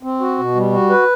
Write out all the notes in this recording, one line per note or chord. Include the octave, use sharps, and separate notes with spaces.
C4
F#4
B2
G3
F#4
B4